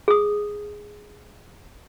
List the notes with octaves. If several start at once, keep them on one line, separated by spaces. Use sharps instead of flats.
G#4 D#6